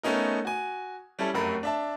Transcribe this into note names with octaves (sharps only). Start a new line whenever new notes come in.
A3 B3 C#4 D#4 A#4
F#4 G#5
G3 C#4 E4 A4
F1 F#2 A3 A#4 B5
D4 E5 A5